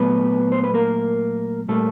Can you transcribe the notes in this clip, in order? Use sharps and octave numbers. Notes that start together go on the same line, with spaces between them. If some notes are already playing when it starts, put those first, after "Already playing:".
Already playing: A#2 F#3 A3 B3 B4
C5
B4
A#3 A#4
A#2 G3 A3 A#3 A4